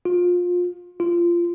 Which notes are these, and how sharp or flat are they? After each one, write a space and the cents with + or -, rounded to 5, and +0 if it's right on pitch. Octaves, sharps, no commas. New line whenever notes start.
F4 +25
F4 -20